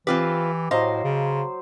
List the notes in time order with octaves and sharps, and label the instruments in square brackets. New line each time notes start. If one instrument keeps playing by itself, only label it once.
[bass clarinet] E3 [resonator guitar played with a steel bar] C4 F4 B4 [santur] G4 G5
[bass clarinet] A2 [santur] F#3 C5 [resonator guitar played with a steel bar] D#5 F5
[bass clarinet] C#3